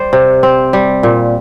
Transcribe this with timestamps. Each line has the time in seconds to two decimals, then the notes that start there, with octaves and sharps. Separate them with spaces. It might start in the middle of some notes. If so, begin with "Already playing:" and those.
Already playing: G3 C5 D5
0.13 C3
0.43 C4
0.73 G3
1.03 A#2